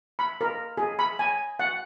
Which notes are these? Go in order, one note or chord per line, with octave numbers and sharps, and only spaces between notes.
B5
A#4
G#4
B5
G#5
F#5